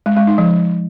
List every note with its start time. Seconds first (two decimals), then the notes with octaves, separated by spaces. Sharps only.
0.06 G#3
0.17 G#3
0.27 D#4
0.38 F3